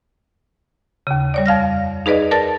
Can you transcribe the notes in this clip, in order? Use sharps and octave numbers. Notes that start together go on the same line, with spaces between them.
D#2 C#3
G3 C#5 D5
F2 F5 F6 A#6
D#4 G#4 B4 D5 D#5
A#4 D5 A5 A6